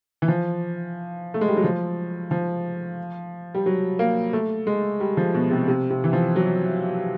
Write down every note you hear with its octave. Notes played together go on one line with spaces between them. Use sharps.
E3
F3
A3
G#3
G3
F#3
F3
F3
G3
F#3
A#3
A3
G#3
G3
F3
B2
C3
C3
C3
E3
F3
F#3